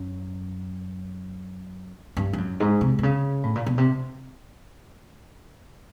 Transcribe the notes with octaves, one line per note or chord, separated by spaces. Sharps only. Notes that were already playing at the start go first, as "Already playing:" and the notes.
Already playing: F#2
G2
G2
F#2
G#2
C3
C3
C#3
A2
A#2
B2
C3